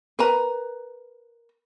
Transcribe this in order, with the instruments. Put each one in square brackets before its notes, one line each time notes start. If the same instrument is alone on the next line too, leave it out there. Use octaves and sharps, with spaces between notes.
[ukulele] A#4 B4 A#5